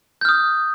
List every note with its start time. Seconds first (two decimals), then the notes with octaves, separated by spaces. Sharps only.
0.21 G6
0.25 F6
0.29 D#6